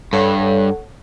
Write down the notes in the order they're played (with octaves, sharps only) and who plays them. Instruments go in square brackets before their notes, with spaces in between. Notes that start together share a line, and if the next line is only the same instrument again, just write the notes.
[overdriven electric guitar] G2 [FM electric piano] A4 C#5 F#5